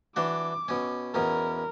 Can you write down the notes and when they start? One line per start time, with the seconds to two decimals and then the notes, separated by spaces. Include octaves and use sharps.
0.16 E3 D4 F#4 D6
0.68 B2 C#4
1.14 E2 B2 C#4 A#4